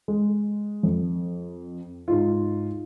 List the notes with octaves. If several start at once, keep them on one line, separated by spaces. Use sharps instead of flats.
G#3
F2
G#2 D#4 F4